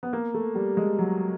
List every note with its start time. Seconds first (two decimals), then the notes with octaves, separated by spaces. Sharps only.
0.03 B3
0.13 A#3
0.34 A3
0.55 G3
0.77 G#3
0.99 F#3